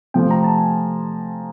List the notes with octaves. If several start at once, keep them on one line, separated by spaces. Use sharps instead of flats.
C3 F3 A3 C4 G5
A#5
A5
G#5